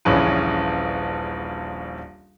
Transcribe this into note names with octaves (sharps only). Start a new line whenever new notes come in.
D#1 A#1 C#3 E3 C#4 B4